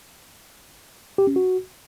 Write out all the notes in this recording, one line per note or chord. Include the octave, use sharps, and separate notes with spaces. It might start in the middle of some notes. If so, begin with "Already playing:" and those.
G4
C#4
F#4